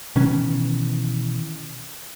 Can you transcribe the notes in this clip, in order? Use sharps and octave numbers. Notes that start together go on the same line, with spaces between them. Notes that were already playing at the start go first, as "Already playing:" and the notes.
B2 D#3 E3 C#4